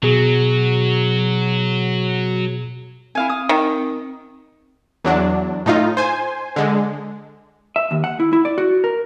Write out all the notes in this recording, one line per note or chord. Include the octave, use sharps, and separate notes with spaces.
B2 F#3 G#4
C4 E4 F5 G#5
D#6
D#3
E2 F#3 D4
A2 D#4 F4
C5 G#5
D3 G#3
E5
D#2
F#5
E4
E4
D5
F#4
A#4